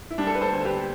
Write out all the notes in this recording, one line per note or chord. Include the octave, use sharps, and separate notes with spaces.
E4
G3 D4
A4
B4
A4 C5
D2
G4 B4